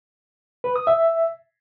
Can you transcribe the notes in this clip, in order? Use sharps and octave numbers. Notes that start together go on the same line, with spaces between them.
B4
D#6
E5